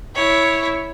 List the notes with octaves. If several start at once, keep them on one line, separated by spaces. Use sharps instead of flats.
E4 C#5